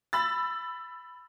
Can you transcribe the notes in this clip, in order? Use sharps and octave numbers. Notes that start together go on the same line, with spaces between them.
B5 E6 A6